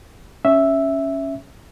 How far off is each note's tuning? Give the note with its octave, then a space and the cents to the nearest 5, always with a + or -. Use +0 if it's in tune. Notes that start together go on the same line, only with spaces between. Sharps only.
C#4 +0 E5 +0